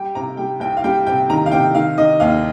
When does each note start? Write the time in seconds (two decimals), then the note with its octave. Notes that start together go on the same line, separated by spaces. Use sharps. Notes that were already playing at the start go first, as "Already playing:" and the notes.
Already playing: G3 G5
0.15 C3 A#5
0.37 G3 G5
0.60 C2 G5
0.77 F5
0.84 G3 G5
1.07 C3 G5
1.30 D#3 A#5
1.46 F5
1.52 C3 G5
1.75 D#3 F5
1.97 D#3 D#5
2.20 D#2 F5